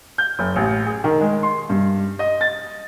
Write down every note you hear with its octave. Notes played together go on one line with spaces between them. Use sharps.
G6
F#1
A1
G#4
D#3
G#3
C6
G2
D#5
A6